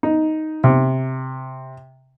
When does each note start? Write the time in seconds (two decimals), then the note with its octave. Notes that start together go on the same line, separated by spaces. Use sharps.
0.03 D#4
0.64 C3